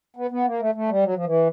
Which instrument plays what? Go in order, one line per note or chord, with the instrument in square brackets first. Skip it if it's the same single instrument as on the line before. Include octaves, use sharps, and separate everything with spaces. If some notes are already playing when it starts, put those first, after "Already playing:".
[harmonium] B3
B3
A#3
A3
A3
G3
F#3
F3
E3